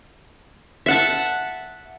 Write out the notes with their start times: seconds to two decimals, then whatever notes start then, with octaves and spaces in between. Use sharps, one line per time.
0.86 E5 F#5 A5